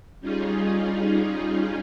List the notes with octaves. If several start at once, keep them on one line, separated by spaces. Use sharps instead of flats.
G3 C#4 D#4 F4 G#4